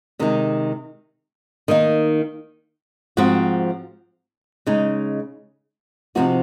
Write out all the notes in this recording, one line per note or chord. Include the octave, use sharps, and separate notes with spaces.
C3 D#3 G#3 D#4
D#3 A#3 D#4
G#2 F3 C4 F#4
C#3 G#3 D#4
C3 F3 C4 D#4 F#4